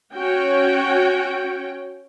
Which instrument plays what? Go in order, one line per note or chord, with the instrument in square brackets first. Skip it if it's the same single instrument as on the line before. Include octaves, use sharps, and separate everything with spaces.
[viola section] C#4 F#4 C#5 G5